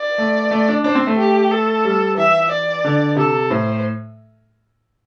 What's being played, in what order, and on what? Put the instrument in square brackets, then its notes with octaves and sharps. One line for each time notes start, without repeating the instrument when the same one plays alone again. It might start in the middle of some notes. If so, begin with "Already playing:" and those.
Already playing: [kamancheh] D5
[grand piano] A3
A3
D4
[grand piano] D4 [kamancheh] C5
[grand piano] C4
A3
[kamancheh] G4
A4
[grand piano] G3
[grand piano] E3 [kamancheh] E5
[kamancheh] D5
[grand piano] D3
[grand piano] C3 [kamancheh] A4
[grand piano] A2 [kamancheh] C5